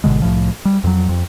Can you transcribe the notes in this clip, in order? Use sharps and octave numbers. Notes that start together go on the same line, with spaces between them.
G#1 B2 D3 G#3
C2 A2 F3
G3
F2 F#3
F2